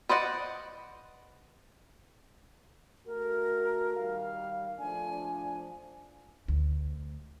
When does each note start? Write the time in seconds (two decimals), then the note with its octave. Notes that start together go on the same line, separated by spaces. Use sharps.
0.09 B4 C5 D5 D#5 F#5
3.07 A3 F#4 A#4
3.96 D#3 G3 F5
4.79 F3 A3 D4 G#5
6.48 D2